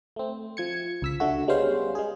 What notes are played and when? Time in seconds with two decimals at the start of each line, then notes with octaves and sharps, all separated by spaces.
0.16 A3 C4
0.57 F3 G#6 C#7
1.02 C#2 E6 B6
1.20 D3 A3 F#4
1.48 G3 G#3 B3 C#4 C5 F5
1.95 G#3 G#4